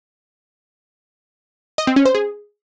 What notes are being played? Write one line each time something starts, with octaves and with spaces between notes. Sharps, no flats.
D#5
C4
C#4
C5
G#4